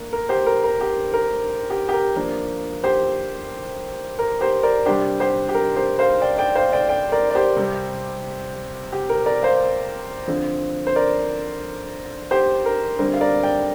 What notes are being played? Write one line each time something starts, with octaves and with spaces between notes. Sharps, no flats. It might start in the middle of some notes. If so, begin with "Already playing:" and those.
Already playing: D3 A#3 D4
A#4
G4 C5
A#4
A#4
G4
A#4
G4
G4
A#4
F3 A#3 D4
G4 C5
A#4
G4 C5
A#4 D5
C3 G3 D4 G4 C5
G4 C5
G4
A#4
G4 C5
C5 F5
D5 G5
D5 G5
C5 F5
D5 G5
D5 G5
A#4 D5
D5
G4 C5
C3 G3 C4
G4
A#4
A#4 D5
C5 F5
D3 F3 C4
C5
A#4 D5
G4 C5
A#4
D3 G3 C4 A#4
F5
A#4 D5
D5 G5